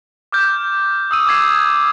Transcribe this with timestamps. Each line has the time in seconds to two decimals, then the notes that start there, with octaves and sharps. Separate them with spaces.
0.32 D6 F6 G6
1.11 D#6 E6 D#7
1.27 D6 E6 G#6 C7